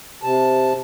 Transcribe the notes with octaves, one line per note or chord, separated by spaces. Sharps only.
C3 A5